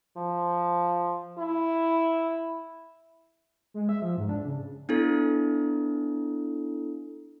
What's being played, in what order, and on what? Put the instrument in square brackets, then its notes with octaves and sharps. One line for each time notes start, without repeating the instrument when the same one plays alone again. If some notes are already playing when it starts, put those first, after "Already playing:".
[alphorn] F3
E4
[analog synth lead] G#3
E5
F3
G#2
D4
C#3
[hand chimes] B3 D4 E4 A4